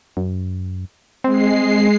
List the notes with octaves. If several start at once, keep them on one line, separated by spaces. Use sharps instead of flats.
F#2
G#3 C4 C7